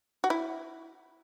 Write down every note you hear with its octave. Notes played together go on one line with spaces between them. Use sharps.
F#4
E4